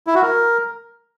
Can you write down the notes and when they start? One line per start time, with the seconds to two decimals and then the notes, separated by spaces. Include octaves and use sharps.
0.07 E4
0.15 F#4
0.22 A#4